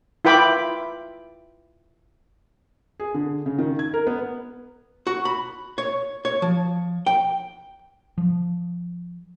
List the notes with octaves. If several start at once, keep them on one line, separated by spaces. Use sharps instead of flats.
E4 F4 B4 G5 B5 D6
G#4
D3
C#3
D#3
G#6
A#4
B3
F#4
B5
C#5
C#5
F3
G5
F3